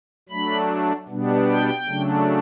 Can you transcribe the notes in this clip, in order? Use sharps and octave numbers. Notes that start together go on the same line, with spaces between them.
F#3 A3 D4 B5
B2 G3 B3 D4
G5
C#3 F#3 A3 D4